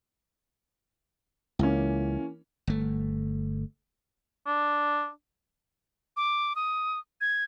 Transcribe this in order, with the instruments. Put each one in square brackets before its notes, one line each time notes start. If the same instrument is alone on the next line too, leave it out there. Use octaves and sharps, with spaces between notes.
[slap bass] C#2 [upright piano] E3 A#3 C#4
[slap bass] G1 A3
[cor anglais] D4
[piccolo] D6
D#6
G#6